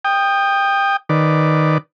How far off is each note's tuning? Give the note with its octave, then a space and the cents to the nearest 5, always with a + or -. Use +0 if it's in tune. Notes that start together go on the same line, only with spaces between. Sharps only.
G5 +15 D#6 -15
D#3 +0 B4 +10 D5 +0